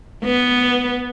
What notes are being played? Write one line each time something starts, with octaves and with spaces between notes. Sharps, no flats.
B3